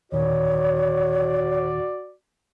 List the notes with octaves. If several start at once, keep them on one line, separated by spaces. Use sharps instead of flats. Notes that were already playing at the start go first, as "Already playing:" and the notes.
D#2 A#2 D#3 F#4 C#5 D5